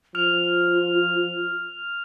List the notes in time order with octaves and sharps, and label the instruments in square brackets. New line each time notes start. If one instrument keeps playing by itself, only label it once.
[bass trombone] F3 [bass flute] F4 [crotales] F6 F7